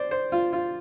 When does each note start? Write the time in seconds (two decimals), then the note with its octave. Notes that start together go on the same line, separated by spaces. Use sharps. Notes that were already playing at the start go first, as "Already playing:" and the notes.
Already playing: C5 D5
0.11 C5
0.32 F4
0.53 F4